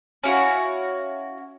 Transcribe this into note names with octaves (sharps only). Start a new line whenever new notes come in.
C#4 E4 F#4 F5